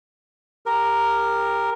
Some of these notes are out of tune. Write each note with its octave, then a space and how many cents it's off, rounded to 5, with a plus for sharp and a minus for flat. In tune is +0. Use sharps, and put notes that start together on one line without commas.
G4 +15 A#4 +0